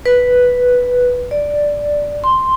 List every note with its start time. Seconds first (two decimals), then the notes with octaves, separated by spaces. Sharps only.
0.06 B4
1.31 D5
2.24 C6